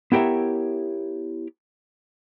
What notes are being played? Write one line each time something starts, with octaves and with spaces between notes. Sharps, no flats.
B3 E4 G4 A#4 C#5 E5